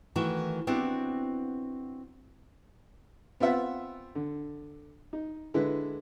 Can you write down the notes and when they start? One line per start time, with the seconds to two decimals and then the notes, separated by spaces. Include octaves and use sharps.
0.16 D#3 E3 A3 E4 F#4
0.67 B3 C4 D4 E4 F#4 G4
3.40 B3 C4 F4 E5 F#5
4.15 D3
5.13 D#4
5.54 D3 G#3 E4 B4